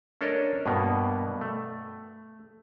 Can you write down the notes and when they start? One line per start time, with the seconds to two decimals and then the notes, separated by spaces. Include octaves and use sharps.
0.21 C#4 D4 A4 A#4 C#5 D#5
0.66 G2 B2 A#3 B3
1.41 A3